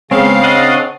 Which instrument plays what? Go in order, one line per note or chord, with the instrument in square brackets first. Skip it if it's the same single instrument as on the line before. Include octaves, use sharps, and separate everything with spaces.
[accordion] C#3 F5 [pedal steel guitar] G#3 B3 [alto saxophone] C4 [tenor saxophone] C#5
[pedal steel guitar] D4 D#5 F#5